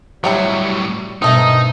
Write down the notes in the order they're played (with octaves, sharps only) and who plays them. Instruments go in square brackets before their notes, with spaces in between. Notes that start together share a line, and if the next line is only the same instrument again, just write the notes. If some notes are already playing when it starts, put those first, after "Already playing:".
[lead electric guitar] A2 F#3 [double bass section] G3 [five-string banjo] E4 G4 C#5
[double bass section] G2 B2 [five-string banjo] D#3 A3 C4 [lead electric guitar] D#4 [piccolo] D#6